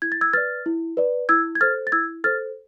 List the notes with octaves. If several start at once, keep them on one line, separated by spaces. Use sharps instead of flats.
E4 G#6
A6
E6 G#6
B4 D5 F6 A6
E4
B4 D5
E4 E6 G#6
G#6
A4 C5 F6 A6
A6
E4 E6 G#6
A4 C5 F6 A6